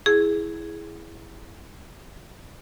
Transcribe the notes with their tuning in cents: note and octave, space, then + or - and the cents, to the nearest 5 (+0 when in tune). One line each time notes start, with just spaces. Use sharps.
E4 +0 G#4 +0